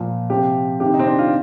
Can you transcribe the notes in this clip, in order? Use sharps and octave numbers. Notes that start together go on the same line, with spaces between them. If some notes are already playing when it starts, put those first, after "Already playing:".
Already playing: A#2 F3
C3 F3 G4
C3 D#3 G4
D#4
C4
D4
F4